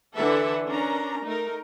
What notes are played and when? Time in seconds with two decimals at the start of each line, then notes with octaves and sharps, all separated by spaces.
0.16 D3 E3 A4 B4 E5 F#5
0.67 C#4 D4 A#4 A#5
1.26 A3 D#4 A#4